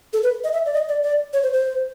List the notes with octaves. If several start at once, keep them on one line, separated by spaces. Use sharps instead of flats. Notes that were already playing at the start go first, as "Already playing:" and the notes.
A4
B4
D#5
E5
D5
D#5
D5
D5
C#5
C5
C5